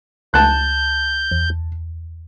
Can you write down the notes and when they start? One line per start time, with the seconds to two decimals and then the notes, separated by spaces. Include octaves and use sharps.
0.34 C#2 A5 F#6 G6
1.31 E2